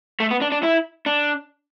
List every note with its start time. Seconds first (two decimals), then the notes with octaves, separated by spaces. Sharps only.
0.20 A3
0.31 B3
0.42 D4
0.52 D4
0.63 E4
1.06 D4